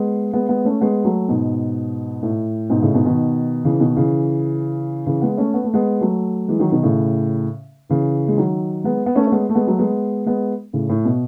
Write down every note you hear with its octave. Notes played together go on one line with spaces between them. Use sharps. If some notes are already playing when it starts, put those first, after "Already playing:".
Already playing: G#3 B3
G#3 B3
G#3 B3
A3 C#4
G#3 B3
F#3 A3
G#2 B2
A2
G#2 B2
A2 C#3
G#2 B2
B2 D#3
C#3 E3
B2 D#3
C#3 E3
C#3 E3
G#3 B3
A3 C#4
B3
A3
G#3 B3
F#3 A3
E3 G#3
D#3 F#3
B2 D#3
A2 C#3
C#3 E3
G#3
D#3 F#3
G#3 B3
B3
A3 C#4
C#4
G#3 B3
A3
G#3 B3
F#3 A3
G#3 B3
G#3 B3
A2 C#3
A2
B2